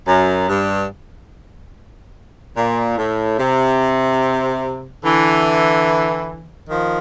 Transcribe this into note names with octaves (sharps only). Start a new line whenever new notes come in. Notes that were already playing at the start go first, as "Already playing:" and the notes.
F#2
G2
A#2
A2
C3
D3 E3
D#3 F3